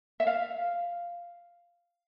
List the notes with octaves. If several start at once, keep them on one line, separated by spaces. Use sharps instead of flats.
E5
F5